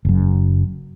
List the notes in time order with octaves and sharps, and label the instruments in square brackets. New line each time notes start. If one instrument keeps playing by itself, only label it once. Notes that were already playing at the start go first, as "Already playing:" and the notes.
[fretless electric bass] F#1 F#2